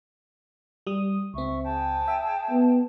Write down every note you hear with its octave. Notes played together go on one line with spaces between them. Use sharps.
G3 D#6
C#2 C4 E5 C#6
G#4 G5 A5
E5
B3